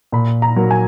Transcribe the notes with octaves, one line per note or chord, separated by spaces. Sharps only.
A#2 B5
A#5
F#3 A#3
G#5